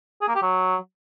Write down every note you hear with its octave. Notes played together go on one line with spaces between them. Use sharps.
G#4
A#3
G4
F#3